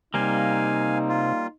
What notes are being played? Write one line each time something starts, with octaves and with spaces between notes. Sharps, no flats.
C3 G3 A#3 D#4 F5 G#5
F4